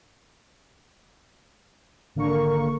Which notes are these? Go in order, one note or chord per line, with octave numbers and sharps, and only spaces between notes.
G#1 D3 A#3 A#4 C#6